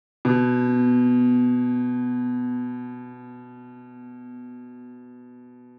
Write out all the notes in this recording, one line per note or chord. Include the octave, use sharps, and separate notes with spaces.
B2